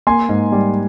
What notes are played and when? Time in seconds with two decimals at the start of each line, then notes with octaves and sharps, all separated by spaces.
0.07 A#3 G#5 C6
0.29 G#2
0.52 G3